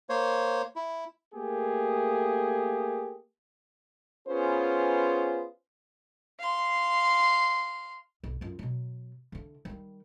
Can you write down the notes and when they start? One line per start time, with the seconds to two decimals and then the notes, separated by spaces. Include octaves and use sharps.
0.09 A#3 C5 C#5
0.76 E4
1.34 A3 A#3 G4 G#4
4.27 B3 C#4 F4 G#4 B4 C5
6.40 F5 C6
8.24 B1
8.41 F#2 F4
8.59 B2 F#3
9.32 D3 E4
9.65 D#3 G3